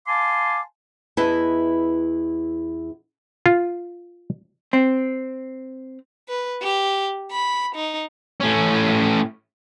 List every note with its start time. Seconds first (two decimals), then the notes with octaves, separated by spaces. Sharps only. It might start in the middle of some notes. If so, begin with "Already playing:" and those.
0.07 F5 G#5 A5 C6 D6
1.17 E2 E4 B4 D#5 E5 A5
3.46 F4
4.73 C4
6.29 B4
6.62 G4
7.31 B5
7.76 D#4
8.41 A2 C#4